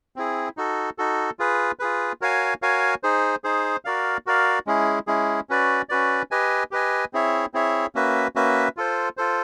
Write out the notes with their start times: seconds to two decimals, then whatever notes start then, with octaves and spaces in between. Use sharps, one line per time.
0.16 C4 E4 G#4
0.57 D#4 F#4 A4
0.98 D#4 F#4 A4
1.39 F4 G#4 B4
1.79 F4 G#4 B4
2.21 F#4 A#4 C#5 F5 G#5
2.62 F#4 A#4 C#5 F5 G#5
3.03 D#4 G#4 C5
3.44 D#4 G#4 C5
3.85 F#4 A#4 D5 F5
4.26 F#4 A#4 D5 F5
4.67 G#3 C#4 E4 G#4
5.07 G#3 C#4 E4 G#4
5.49 C#4 F#4 B4 D5
5.89 C#4 F#4 B4 D5
6.31 G4 B4 D#5 G#5
6.71 G4 B4 D#5 G#5
7.13 C4 E4 G#4 C#5 E5
7.54 C4 E4 G#4 C#5 E5
7.95 A#3 C#4 F#4 B4 E5
8.35 A#3 C#4 F#4 B4 E5
8.77 F4 A4 C5
9.17 F4 A4 C5